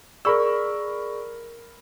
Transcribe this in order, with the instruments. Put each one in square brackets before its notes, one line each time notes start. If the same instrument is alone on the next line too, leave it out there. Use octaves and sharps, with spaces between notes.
[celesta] G#4 D5 C#6 [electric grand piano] A#4 B5 E6